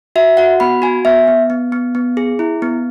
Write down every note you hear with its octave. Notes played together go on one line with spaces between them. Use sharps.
F#4 E5
F#4 F#5
B3 B5
F#4 G#5
B3 E5
B3
B3
B3
B3
G#4
E4
B3